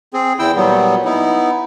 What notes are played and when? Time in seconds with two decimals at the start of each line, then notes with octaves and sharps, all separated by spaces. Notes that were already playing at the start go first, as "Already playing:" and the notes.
0.13 C4 G#4
0.39 E2 E4 G5 E6
0.56 A#2 F#3 G3 B3
1.05 B3 D#4 E4